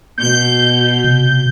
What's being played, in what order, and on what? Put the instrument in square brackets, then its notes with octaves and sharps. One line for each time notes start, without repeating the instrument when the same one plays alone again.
[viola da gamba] B2 [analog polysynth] G6
[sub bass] C3